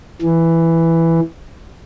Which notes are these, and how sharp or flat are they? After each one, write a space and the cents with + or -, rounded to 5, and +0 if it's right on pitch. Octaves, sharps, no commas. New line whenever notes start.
E3 +5